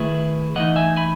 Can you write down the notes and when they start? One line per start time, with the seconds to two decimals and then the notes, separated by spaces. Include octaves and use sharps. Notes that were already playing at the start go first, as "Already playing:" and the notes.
Already playing: D#3 A3 E4 G#4 B4
0.55 E3 A3 D#4 D#5 F#5
0.76 E5 G#5
0.96 G#5 B5